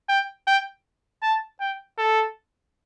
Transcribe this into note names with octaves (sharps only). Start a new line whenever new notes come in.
G5
G5
A5
G5
A4